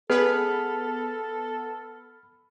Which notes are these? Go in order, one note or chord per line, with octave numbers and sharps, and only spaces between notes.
B3 G#4 A4 B5 F6